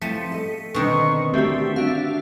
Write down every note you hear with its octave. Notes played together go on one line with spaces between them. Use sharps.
F3 A3 C4 E4 A5 B6 C#7 D#7
A4 D#5
B2 D3 D#3 C4 A#4 C#6
A3 C4 D4 F#4 G4 E5
D4 F#4 F5